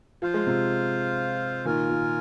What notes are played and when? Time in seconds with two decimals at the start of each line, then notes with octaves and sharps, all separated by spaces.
0.22 F3 F4 C5 F5
0.34 G#3
0.47 C3 F3
1.65 A#2 D#3 F4 A#4 G#5
1.89 A#2